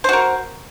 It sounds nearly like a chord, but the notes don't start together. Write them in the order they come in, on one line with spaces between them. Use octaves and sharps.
C5 F#4 A#4